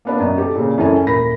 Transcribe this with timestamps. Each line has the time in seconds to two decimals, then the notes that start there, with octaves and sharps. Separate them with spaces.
0.05 A#3 B3 D4
0.19 F#2 B2
0.38 G4 A4
0.55 A#2 C#3
0.77 C#2 F#2 E3 A4 G#5
1.07 D#1 A#4 B5 A#6